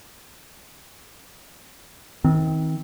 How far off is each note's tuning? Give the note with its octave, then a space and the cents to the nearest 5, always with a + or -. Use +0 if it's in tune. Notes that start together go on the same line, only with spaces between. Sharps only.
D#3 +35 C4 +0